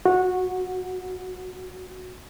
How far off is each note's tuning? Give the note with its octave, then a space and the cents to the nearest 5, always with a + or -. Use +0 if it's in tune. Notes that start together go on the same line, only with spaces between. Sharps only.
F#4 -15